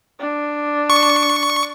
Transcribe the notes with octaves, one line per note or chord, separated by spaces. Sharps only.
D4
C#6